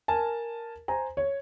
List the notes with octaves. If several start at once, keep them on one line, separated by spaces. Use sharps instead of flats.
A#4 G#5 A5
C5 G#5 A#5
C#5